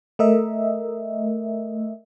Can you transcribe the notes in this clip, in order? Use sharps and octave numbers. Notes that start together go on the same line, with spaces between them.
A3 A#4 D#5 E5